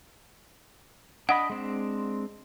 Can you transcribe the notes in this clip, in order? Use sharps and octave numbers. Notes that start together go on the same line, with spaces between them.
D4 D#5 F#5 B5
G#3 C4 D4